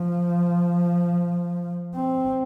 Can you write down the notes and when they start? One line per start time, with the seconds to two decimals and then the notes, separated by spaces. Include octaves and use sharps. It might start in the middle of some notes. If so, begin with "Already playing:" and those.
Already playing: F3
1.95 C4